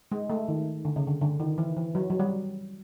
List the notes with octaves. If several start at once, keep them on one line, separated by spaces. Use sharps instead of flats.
G#3
A3
D#3
D3
C#3
D3
D3
D#3
E3
E3
F#3
F#3
G3